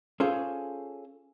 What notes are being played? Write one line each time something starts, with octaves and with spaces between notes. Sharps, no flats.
C#4 F4 G#4 A4 C5